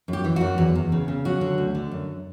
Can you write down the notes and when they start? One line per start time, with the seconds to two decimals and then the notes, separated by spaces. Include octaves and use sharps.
0.08 F#2
0.13 G4
0.24 E3
0.36 F#2 F#4
0.58 E2
0.75 E2
0.92 C#3
1.08 C#3
1.25 F#3 F#4
1.41 D3
1.58 D2
1.75 D3
1.91 F#2